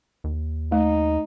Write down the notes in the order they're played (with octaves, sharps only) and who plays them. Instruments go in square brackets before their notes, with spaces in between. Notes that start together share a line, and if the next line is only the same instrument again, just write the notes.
[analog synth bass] D#2
[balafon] A3 [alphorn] D#4